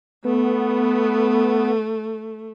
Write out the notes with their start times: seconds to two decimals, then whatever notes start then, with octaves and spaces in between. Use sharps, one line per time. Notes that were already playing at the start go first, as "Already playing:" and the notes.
0.25 A3 B3